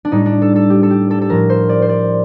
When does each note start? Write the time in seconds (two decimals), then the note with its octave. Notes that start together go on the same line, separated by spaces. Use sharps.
0.05 D4
0.12 A2 G3 D#4
0.26 D4
0.42 A4
0.56 A4
0.70 G4
0.83 A4
0.91 G4
1.11 A4
1.22 A4
1.30 A2 F3 A#4
1.50 C5
1.69 D5
1.82 C5
1.89 D5